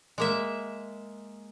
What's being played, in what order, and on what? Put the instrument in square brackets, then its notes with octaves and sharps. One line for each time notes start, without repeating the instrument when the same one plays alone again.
[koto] G#3 A#3 E5